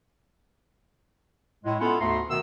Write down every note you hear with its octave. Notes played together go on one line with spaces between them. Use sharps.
A2 G#3
B3 C#4 E4 F4 A4 F#5
D2 G#2 A3 A#5 C6
B2 D#3 A3 B3 E6